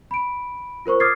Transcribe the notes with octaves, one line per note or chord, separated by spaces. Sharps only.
B5 D7
F4 A#4 C5 C#6
D6 D#6 F6 G#6 A6 C7